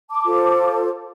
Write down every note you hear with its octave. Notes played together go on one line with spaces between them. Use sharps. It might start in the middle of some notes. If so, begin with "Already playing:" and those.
A5 D6
F4 A4 C5